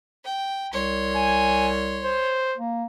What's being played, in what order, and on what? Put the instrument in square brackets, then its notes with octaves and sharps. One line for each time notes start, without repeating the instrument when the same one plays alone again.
[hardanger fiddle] G5
[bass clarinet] C2 [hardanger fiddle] C#5 C6
[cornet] G#5
C5
[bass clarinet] A#3